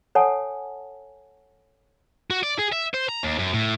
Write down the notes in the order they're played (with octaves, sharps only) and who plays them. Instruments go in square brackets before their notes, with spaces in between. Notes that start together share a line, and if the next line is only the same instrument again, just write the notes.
[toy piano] A4 C#5 F#5 G#5 A5
[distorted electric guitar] F#4
D5
G#4
E5
C5
A#5
D#2
F#2
A2